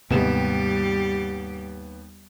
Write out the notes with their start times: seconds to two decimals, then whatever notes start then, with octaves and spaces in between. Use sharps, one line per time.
0.10 D#2 G#2 C3 G3 G#3 B3 G4 E7